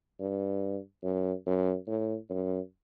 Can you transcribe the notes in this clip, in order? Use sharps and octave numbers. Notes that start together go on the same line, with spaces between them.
G2
F#2
F#2
A2
F#2